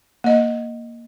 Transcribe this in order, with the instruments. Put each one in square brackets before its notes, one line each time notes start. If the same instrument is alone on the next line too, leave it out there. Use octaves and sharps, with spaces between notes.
[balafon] A#3 D#5